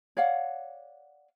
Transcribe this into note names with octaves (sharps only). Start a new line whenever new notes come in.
C#5 D5 F5 F#5